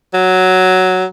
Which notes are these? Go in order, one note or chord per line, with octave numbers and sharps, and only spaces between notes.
F#3